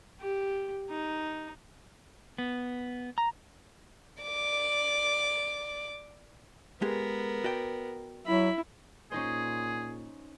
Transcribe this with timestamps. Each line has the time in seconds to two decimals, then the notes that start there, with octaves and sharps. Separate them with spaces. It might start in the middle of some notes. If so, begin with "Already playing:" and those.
0.21 G4
0.90 D#4
2.38 B3
3.18 A#5
4.22 D5 D6
6.82 G#3 B3 G4 G#4 A#4
7.44 F#4 D5 G5
8.27 F#3 E4 B5
9.12 A#2 C#4 D#4 G#4 C5